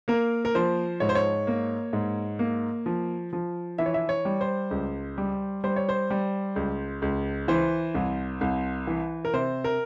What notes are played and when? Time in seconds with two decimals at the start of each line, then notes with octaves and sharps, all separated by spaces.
0.08 A#3 A#4
0.45 A#4
0.55 F3 C5
1.00 G#2 C#5
1.09 C5
1.15 C#5
1.47 A#3
1.93 G#2
2.39 A#3
2.86 F3
3.33 F3
3.78 E3 E5
3.86 C#5
3.94 E5
4.09 C#5
4.25 G3
4.41 C5
4.71 C#2
5.18 G3
5.64 G3 C5
5.76 C#5
5.89 C5
6.10 G3
6.56 C#2
7.02 C#2
7.48 E3 C5
7.95 C2
8.41 C2
8.87 E3
9.25 A#4
9.33 C3 C5
9.64 A#4